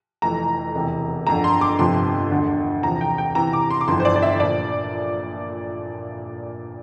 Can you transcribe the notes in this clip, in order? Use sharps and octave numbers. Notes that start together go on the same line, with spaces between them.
F1 F2 E3 A#5
E1 E2 C3 E3
G1 F2 D3 A#5
C6
D6
G1 F2 C3 F3 C6
E1 D2 D3
E2 C3 F3 A#5
G5
G5
E2 C3 E3 A#5
D6
C6
D6
G1 F2 E3 C6
C5
D5
D5
E5
A#2 F3 D5